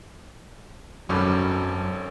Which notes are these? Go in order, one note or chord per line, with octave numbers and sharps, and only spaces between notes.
G#1 F#2 B2 D3 F#3 G3 C#4 A4